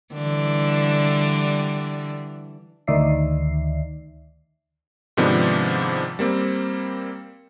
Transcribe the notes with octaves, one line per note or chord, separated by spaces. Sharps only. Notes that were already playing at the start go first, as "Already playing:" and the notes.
D3 E3 G3
D2 D#3 D#4 D5 E5 C7
G#2 C3 D#3 F3 B3 D4
G3 A#3 C4